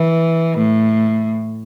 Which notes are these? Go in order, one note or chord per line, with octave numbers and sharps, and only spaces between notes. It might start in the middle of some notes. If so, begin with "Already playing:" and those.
Already playing: E3
A2